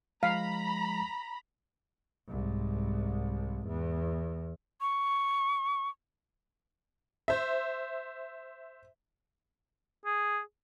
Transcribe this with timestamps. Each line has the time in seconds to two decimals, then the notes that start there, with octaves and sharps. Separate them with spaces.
0.23 F3 G#3 F5 A#5 B5 B6
2.29 C2 G#2
3.67 E2
4.81 C#6
7.28 C5 E5
10.06 G#4